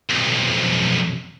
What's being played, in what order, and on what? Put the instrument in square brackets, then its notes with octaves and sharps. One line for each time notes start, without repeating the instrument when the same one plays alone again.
[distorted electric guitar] B1 F2